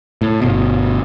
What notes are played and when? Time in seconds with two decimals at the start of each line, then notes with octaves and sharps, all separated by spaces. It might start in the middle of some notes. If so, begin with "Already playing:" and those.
0.22 A2
0.41 G1 B2